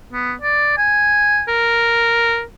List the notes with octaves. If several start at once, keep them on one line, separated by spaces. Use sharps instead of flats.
B3
D5
G#5
A#4